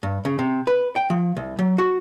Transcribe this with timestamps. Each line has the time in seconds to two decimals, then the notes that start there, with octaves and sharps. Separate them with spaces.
0.03 G2
0.25 C#3
0.39 C3
0.67 B4
0.96 G5
1.10 F3
1.37 C2
1.59 F#3
1.78 F#4